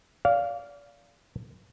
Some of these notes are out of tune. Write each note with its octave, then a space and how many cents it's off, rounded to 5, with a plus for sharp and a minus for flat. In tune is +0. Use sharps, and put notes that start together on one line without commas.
D5 -30 F5 +0